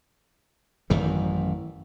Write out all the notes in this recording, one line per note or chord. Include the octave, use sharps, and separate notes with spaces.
A1 F#2 D#3 E3